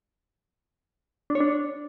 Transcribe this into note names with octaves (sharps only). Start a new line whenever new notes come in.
D4
C#5
D4